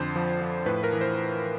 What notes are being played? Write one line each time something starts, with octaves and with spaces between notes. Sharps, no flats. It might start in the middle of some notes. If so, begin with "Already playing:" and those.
Already playing: F2 D3 C5
F3
F3
A2 B4
A#4
E3
C5